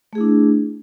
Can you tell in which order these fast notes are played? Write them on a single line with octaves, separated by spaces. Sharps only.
A3 G#4 E4 D4